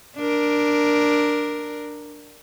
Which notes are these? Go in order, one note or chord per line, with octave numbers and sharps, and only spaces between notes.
D4 A#4